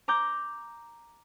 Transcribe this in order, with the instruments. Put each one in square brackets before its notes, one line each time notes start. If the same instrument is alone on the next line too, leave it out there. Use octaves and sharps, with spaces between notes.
[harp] A#5 D6 G6 A#6